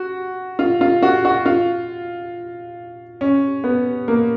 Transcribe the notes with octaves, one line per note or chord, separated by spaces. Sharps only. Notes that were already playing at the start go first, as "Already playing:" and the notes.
Already playing: F#4
F4
F4
F#4
F#4
F4
C#4
B3
A#3